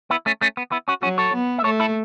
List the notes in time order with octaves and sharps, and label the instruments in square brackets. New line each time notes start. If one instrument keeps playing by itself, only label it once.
[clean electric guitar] B3 E4
A3 C#4
A3 C#4
B3
B3 E4
C#4 F#4
[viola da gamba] F#3 [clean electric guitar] C#4 F#4
[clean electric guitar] A4 C#5
[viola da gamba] B3
[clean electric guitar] E5
[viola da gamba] A3 [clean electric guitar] A4 C#5
[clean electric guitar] E4 A4